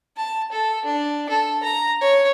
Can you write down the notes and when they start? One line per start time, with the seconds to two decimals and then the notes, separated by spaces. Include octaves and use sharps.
0.17 A5
0.52 A4
0.85 D4
1.29 A4
1.63 A#5
2.01 C#5